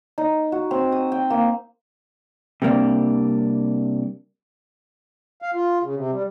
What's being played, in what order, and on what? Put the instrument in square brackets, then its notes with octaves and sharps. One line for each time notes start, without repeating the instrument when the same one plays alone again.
[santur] D#4
F#4
C4
D#6
G5
A#3
[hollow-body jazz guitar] C3 G3 A#3 D4
[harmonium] F5
F4
C#3
C3
G3